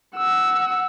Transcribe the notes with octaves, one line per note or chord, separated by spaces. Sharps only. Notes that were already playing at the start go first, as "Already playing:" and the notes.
F#5 E6